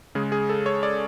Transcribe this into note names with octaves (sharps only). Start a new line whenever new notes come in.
C#3 G#3 G#4
G#4
A4
C#5
D5